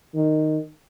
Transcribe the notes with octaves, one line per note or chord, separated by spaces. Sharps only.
D#3